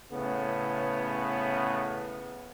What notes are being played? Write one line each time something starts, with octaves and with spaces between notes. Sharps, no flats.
A2 C#3 B3